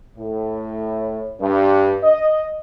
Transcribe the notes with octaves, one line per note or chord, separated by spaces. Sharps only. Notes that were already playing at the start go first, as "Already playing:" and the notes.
A2
G2
D#5